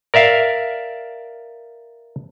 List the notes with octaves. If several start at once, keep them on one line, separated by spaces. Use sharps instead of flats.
A#4 D5 E5 F5